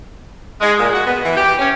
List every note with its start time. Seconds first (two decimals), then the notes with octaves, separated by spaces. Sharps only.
0.61 G#3
0.79 A#2
0.93 F#4
1.05 B3
1.24 E3
1.36 G4
1.59 C#4